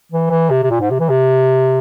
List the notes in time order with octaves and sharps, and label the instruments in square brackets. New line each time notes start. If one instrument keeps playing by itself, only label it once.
[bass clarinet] E3
E3
C3
C3
A#2
G#2
C3
E3
C3